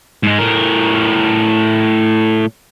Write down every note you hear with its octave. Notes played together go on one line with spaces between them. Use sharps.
G#2 G#3
A2 A#4